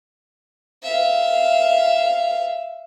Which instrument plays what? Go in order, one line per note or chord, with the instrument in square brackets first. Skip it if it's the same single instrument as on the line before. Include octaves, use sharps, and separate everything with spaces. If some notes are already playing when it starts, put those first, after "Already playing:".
[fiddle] E5 F5